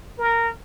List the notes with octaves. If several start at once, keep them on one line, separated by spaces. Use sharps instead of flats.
A#4